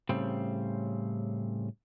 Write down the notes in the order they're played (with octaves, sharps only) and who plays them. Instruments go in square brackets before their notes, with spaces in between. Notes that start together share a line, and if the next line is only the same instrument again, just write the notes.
[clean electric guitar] A2 C#3 G3 C4